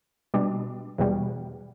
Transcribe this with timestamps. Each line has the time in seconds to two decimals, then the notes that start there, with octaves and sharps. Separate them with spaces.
0.34 B2 G3 D4
0.98 E2 B2 G3